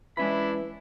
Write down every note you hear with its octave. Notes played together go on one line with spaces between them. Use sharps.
E3 G#3 C#4 D4 E4 B5